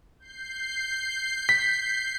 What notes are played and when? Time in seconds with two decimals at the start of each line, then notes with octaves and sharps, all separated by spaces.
0.19 G6 C7
1.49 B6